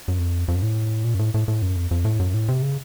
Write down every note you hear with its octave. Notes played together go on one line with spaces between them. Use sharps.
F#2
F2
F2
F#2
A2
A#2
F#2
A2
A2
A2
F#2
F2
F2
A2
F#2
A2
C3
C#3